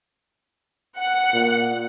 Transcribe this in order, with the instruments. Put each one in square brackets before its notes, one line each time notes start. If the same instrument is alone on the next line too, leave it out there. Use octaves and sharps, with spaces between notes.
[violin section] F#5
[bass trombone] A#2